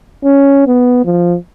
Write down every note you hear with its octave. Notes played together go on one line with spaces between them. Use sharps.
C#4
B3
F3